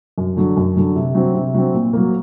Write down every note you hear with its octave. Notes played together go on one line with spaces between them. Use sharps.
F#2
D3 F#3
F#2
D3 F#3
C3
F#3 C4
C3
F#3 C4
A#2
F#3 A#3